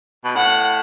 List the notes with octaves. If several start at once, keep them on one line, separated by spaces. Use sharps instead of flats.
B2
A2 F#5